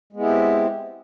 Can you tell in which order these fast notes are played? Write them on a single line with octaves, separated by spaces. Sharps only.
G#3 B3 E4 G4 C4